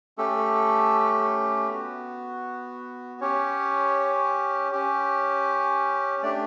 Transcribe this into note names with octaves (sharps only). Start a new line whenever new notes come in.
A3 C#4 G4 A4
B3 F#4
C#4 G4 C#5
C#4 G4
A3 D4 G4 D5